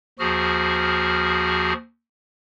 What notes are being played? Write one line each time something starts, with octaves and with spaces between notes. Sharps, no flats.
D#2 F3 F#4 G#4 F6